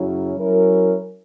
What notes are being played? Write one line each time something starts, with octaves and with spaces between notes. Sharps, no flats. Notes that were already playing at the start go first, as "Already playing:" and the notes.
Already playing: F#2 C#3 F#3 C#4 E4
F#3 C#4 E4 A#4